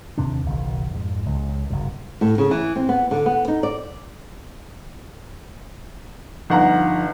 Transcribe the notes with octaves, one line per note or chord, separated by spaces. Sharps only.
D#2 C3 C4 D4
F#1 B1 D#3
F2 G#2
C#2
F#1 G2 C3
A2
C#3
E3
C4
B3
D3
B3
D#4
D5
G1 F3 D#4 F#5 A#5